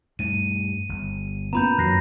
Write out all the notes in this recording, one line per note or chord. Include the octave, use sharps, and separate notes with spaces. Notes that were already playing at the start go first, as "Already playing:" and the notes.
G2 A3 D#7
G1
A#3 B3 C#4 F4 B4 A#5 B5 G6
F#2 D#3 F#3 F#6 A#6 C7